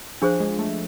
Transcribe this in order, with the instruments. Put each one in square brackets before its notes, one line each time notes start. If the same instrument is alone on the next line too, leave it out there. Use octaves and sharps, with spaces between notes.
[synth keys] F3 [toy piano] D4 G#4 C5
[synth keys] G#3
A3